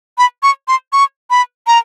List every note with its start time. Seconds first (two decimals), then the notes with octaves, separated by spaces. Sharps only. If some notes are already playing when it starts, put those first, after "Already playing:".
0.18 B5
0.43 C#6
0.68 C6
0.93 C#6
1.30 B5
1.67 A#5